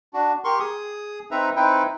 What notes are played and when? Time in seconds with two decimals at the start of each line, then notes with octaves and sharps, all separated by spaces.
0.14 D4 F#4
0.44 G4 A#4 C6 C#6
0.60 G#4 D#6
1.31 C4 D#4 B4 E5 A#5
1.56 C4 D#4 E4 B4 G5